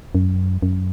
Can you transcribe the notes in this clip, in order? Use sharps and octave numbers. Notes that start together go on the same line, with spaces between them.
F#2
F#2